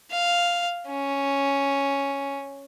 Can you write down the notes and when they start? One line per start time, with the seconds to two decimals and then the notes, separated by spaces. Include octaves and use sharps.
0.12 F5
0.88 C#4